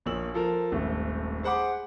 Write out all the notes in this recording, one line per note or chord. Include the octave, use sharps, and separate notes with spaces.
A#1 A#2 C#5 E6 F#7
F3 A4 A#4
D#1 G#1 A3
G#4 C5 F#5 B5 D6